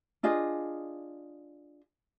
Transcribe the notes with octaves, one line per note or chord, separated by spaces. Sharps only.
D4 F4 G#4 D#5